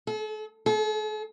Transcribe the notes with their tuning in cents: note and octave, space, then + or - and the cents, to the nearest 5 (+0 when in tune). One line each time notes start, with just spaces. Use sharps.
A4 -40
A4 -45